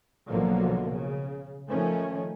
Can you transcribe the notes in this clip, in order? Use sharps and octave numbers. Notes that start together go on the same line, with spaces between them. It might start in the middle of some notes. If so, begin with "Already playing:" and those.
B1 B2 D3 F3 F#3 A#3
C#3
D#3 F3 A3 C#4